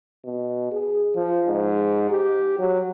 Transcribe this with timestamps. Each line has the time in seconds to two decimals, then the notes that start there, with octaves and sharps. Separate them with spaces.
0.25 B2
0.72 G#4
1.15 F3
1.47 G#2
2.10 G4
2.59 F#3